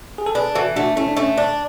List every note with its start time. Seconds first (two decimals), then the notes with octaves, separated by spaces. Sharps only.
0.18 G#4
0.26 A4
0.35 D4 G#4 B4
0.55 E3 F#4 A4
0.76 A3 D4 F#4
0.96 A3 C#4 E4
1.08 D4
1.17 A3 C#4
1.38 D4